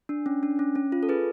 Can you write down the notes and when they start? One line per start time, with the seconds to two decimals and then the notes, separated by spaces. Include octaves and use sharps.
0.09 D4
0.26 C#4
0.43 D4
0.59 C#4
0.75 C#4
0.92 F4
1.03 A4
1.09 G#4 B4